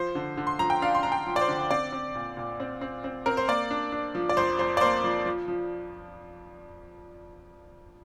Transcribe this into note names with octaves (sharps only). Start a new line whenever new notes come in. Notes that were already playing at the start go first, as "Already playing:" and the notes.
Already playing: F3 C5
D3
D3
C6
F3 A#5
G5
D4 F5
C6
D4 A#5
G5
F3
D5
C5
D3
C4 D5
C4
A#2
A#2
C4
C4
C4
C4 A#4
C5
A#3 D5
D4
D4
F3
D5
F2 C5
F2 C5
D5
A#3 C5
F3
F3
F3